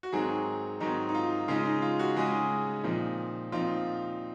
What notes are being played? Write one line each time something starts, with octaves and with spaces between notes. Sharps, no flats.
F#4
G#2 D#3 F#3 C4 D#4 G#4
G#2 D#3 F#3 C4 D#4
D#4
F4
C#3 G#3 D#4 F4
D#4
F4
F#4
C#3 G#3 D#4 G#4
A#2 F3 C4 D#4
A#2 F3 C4 D#4 F4